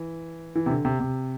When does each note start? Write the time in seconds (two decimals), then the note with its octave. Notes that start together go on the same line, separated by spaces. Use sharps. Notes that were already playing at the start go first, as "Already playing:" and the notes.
Already playing: E3
0.55 E3
0.66 C3
0.70 D3
0.85 C3
1.00 C3